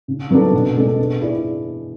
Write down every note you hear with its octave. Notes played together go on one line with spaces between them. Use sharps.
C#3
F#3 B3 D4 A4
B2
G#3 D4 A4
B3
E4 G#4 D5